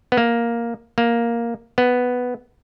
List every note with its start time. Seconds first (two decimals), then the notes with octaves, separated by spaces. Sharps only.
0.12 B3
0.17 A#3
0.98 A#3
1.78 B3